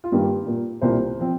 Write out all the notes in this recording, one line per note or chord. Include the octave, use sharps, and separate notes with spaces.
F4
G2 D#3 A#3 G4
A#2 A#3
C2 A#2 A#3 C5
F3 C4